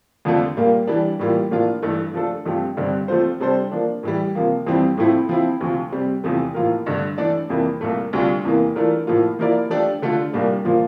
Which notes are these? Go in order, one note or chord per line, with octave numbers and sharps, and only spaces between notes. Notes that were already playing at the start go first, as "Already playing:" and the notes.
F2 D3 F3 A3
A#2 G3 A#3
E3 G3 D4
A2 E3 G3 A#3 F4
A2 F3 A#3 D4 F4
G2 E3 A3
F3 A3 D4 A4
G2 F3 A3 C4 G4
G2 D3 G3 C4
F3 A3 C4 F4 C5
C3 G3 D4 A4 C5
F3 A#3 D4
A2 E3 G3
C3 F3 A#3
F2 E3 G3 C4
A2 F3 A3 C4 E4
F3 C4 E4
D2 C3 F3
C3 G3 C4
E2 C3 F3 A3
A2 F3 A#3 F4 A#4
G2 D3 A3
E3 A3 D4 A4 D5
F2 C3 E3 A#3 E4
C2 A#2 A3
D2 C3 G3 D4 F4
E2 C3 E3 A#3
E3 A3 D4 F4 A#4
A2 F3 A#3 F4
F3 A#3 E4 A#4 D5
F3 A3 D4 G4
D3 A3 D4 F4
C2 A#2 G3 D4
A#2 F3 A#3 F4